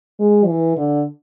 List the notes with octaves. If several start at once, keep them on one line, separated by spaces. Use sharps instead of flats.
G#3
E3
D3